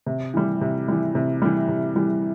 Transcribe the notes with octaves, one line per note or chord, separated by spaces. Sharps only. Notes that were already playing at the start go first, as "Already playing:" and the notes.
C3
E3 G3
C3
E3 G3
C3
E3 G3
C3
E3 G3